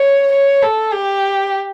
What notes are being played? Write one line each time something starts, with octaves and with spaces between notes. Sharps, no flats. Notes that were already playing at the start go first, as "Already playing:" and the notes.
Already playing: C#5
C#5
A4
G4